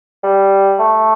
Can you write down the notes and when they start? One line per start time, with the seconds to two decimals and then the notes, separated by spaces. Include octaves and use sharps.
0.24 G3
0.79 A3